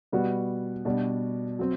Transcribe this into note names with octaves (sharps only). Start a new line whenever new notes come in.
B2 G3 B3 F#4
B2 G3 D4 F#4
F#3 C4